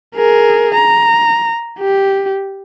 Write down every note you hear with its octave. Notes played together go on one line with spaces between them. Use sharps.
G#4 A#4
A#5
G4